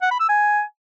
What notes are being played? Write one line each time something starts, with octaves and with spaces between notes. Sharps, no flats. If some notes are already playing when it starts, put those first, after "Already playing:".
F#5
B5
E6
G#5